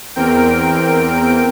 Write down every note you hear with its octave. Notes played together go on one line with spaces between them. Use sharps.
E2 C4 A#4 G5 D7